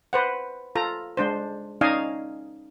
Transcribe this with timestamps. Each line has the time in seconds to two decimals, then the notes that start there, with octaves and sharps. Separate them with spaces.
0.13 B4 C5 F#5
0.75 F4 A4 A#5
1.17 G#3 D4 C5
1.81 C#4 D#4 D5 D#5 F5 G#5